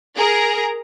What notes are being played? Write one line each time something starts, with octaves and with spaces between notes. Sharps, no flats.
G#4 A#4 A#5